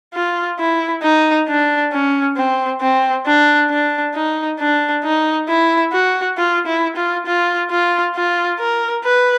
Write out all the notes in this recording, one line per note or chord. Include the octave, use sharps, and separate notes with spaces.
F4
E4
D#4
D4
C#4
C4
C4
D4
D4
D#4
D4
D#4
E4
F#4
F4
E4
F4
F4
F4
F4
A#4
B4